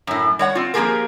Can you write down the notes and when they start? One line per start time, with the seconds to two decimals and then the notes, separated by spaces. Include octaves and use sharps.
0.07 F#2 A2
0.39 G3 C#5 F#5
0.55 C4 F4
0.74 F3 A#3 F4 G4 G#4 A#4